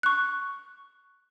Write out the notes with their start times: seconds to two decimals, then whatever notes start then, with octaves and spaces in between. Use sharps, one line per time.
0.03 C#6 F#6